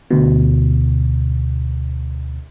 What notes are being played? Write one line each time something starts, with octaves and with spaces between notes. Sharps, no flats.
D2 B2